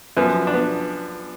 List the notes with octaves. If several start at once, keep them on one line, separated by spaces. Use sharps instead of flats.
F#2 F3 B3
D4
B3